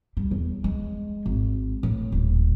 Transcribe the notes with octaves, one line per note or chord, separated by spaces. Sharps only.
G3
E2
G#3
G#1
A2
D#1